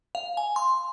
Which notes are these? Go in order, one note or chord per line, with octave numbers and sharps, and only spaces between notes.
F5
G#5
C6